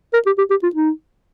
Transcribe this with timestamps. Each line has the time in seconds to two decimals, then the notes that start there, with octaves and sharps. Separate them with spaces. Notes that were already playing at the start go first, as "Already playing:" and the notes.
0.13 A#4
0.26 G4
0.38 G4
0.50 G4
0.63 F4
0.75 D#4